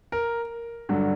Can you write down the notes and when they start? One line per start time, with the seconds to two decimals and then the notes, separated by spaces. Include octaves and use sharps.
0.12 A#4
0.89 G2 D3 F#3